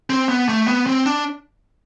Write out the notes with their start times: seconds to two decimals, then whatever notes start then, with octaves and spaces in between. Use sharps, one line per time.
0.10 C4
0.29 B3
0.49 A3
0.68 B3
0.87 C4
1.06 D4